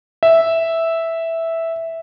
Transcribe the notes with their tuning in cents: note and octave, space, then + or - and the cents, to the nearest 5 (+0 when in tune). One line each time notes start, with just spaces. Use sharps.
E5 -5